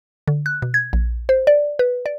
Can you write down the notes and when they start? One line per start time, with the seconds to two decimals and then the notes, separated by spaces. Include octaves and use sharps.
0.28 D3
0.46 F#6
0.62 B2
0.74 G#6
0.93 A#1
1.29 C5
1.47 D5
1.79 B4
2.06 D5